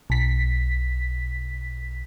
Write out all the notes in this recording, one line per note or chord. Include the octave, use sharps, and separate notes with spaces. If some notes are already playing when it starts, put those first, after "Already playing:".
B1 B6